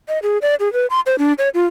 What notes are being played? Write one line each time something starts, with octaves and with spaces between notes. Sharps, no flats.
D#5
G#4
D5
G#4
B4
C6
C5
D4
C#5
F4